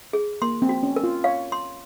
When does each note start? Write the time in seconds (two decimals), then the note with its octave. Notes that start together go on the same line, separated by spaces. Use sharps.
0.13 G#4
0.42 A#3 C6
0.62 C4
0.69 F#4
0.83 C#4
0.96 A#4
1.04 F4
1.24 C#5 F5
1.52 C6